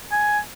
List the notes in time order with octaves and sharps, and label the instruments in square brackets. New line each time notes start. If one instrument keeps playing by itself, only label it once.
[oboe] G#5